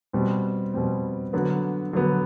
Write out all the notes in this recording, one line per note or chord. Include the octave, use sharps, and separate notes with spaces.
B2 G3 C4
B2 G3 C4
D3 F#3 B3
D3 F#3 B3